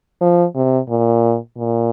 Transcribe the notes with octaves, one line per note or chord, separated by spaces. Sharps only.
F3
C3
A#2
A#2